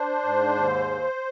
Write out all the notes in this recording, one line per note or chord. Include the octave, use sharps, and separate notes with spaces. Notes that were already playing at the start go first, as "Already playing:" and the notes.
Already playing: D4 C5
G#2
D#2